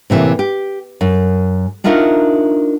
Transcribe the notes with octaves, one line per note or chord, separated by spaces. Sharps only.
A2 C3 E3 A#3
G4
F#2
D4 D#4 F4 F#4 A#4 E5